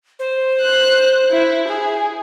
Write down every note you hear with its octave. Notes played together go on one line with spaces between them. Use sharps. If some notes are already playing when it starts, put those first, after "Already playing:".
C5
F#6
E4
G#4